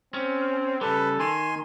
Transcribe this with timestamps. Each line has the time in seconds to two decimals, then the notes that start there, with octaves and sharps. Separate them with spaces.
0.14 C4 C#4
0.81 C#3 G3 A4 B4
1.20 D#3 G#5 C6